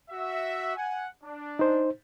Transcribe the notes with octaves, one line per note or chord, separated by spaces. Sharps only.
F#4 E5
F#5 G#5
D4
D#4 C5